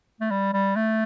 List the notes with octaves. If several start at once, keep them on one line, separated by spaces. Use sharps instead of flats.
A3
G3
G3
A3